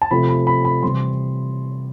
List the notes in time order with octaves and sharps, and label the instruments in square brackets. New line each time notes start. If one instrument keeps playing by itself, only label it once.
[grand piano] A5
C3 F3 A3 C4 B5
B5
B5
B5
C3 E3 G3 C4 C6